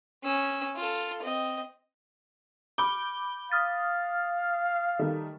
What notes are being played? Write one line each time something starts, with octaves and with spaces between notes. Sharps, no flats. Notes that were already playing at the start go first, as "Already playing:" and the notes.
C#4 E6
F4 A4
C4 D#5
B5 D6 G6 G7
F5 D#6 F6 A6
D#3 G3 A3